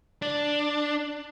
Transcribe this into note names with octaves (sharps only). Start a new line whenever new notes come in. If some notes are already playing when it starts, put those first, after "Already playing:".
D4